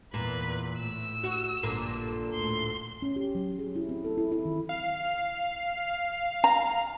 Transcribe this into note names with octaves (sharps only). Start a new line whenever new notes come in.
E2 A#2 B4
A2 E6
F#4
A#1 G2 A#2 D3
D2 A2 C6
C#4
G4
F#3
G#4
E4
C4
A4
E4
E4
D#3
F5
A#5